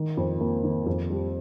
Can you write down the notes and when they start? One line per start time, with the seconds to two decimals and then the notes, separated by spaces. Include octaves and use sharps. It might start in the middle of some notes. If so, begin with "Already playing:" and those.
Already playing: D#3
0.17 F2
0.41 A#3
0.63 D#3
0.86 F2
1.10 G3